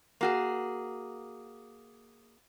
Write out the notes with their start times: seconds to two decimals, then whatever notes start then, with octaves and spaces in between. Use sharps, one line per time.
0.21 A#3 F#4 G#4